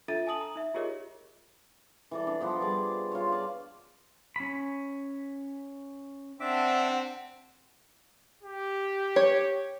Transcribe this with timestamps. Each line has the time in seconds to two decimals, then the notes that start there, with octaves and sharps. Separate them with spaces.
0.08 D4 F4 A4 E5 A6 D#7
0.27 G#5 A5 D#6 F#7
0.41 A#5
0.56 D#4 E5
0.74 F4 G4 G#4 A#4 C#5 D#5
2.11 E3 A4 D5
2.27 D4
2.40 F3 B3 C5
2.61 G3 G#4 D5 D6
3.12 F4 C#5
3.32 D5 A5
4.36 C#4 B5
6.40 C4 D4 E5 F#5 A5 D6
8.43 G4
9.16 C#5